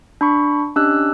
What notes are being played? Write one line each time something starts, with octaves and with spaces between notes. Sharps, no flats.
D4 B5 C#6
C#4 D4 G4 D#5 E6 F#6